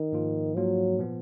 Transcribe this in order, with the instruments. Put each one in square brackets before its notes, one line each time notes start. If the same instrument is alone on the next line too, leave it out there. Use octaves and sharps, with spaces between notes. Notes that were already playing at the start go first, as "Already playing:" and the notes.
Already playing: [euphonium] D#3
[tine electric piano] G#2 F3 A#3 F4
[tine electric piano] G#2 F3 A#3 F4 [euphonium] F#3
[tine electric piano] A#2 F3 B3